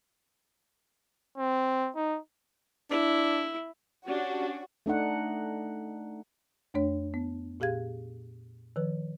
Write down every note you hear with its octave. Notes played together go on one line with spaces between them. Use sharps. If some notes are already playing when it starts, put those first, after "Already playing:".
C4
D#4
D4 E4
C#4 D4 F#4 G4
A3 D4 D#4 F#5
F2 A3 D4 C#5
B3
A#2 G4 G#4 F5 G#6
D#3 F3 B4